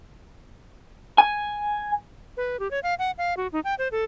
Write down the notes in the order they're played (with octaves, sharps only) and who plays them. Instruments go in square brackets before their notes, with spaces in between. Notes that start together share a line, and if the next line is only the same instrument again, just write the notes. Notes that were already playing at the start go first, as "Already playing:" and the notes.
[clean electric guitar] G#5
[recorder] B4
G4
C#5
F5
F#5
F5
F#4
D#4
G5
C5
A4